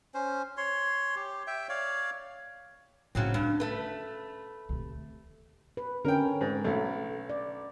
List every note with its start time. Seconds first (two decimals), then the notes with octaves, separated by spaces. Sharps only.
0.14 C#4 C5
0.57 C#5 C6
1.16 G4
1.47 E5 G5
1.69 C#5 D5 F5
3.15 A2 C#3 F#3 C4
3.34 G2 C#4
3.60 A3 B4
4.69 D2 C3
5.77 B4
6.05 D3 C#4 A#4 G5
6.41 G#2
6.64 B1 A3
7.30 D5